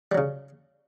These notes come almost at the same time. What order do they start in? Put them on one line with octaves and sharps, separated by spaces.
G3 F#3 C#3